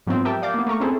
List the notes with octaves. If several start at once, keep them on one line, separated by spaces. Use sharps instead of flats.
G#2 F3 F#3 B3 C4
G4 A#4 E5 G5 A5
D5 F5 D6 G6 A6
A#3 B3
A3 A#4 A#5 C#6
C4 C#4 E4 G#4 A4 C5